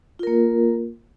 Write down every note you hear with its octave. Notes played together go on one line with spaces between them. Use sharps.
A#3 F4 A#4